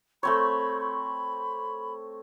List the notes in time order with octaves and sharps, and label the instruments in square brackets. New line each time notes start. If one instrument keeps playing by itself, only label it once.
[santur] A3 C4 C#5 [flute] B5
[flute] B5